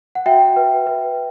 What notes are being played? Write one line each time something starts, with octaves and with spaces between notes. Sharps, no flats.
F#5
F#4 E5 G5
B4
B4